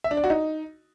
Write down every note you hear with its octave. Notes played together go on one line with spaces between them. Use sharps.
E5
D4
D5
F#4
D#4